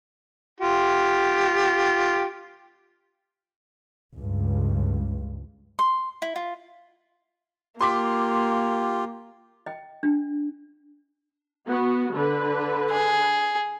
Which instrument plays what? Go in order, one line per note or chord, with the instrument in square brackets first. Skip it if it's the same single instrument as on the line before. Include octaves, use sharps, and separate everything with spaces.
[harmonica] F4 G4
[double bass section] C#2 G2
[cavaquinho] C6
E4
F4
[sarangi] A#3 [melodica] F4 G4 [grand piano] C6 D6 B6
[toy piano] D#5 G5
D4
[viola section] B3 F#4
D3 B4
[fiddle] G#4